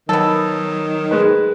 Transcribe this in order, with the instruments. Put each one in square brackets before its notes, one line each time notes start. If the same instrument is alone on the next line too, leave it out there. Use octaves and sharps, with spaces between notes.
[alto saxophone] D#3 [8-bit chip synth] F#3 [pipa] B3 A4
[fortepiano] G#3 B4